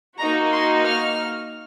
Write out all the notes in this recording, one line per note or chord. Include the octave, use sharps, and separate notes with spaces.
A#3 D#4 F#4 A#5
C6
F6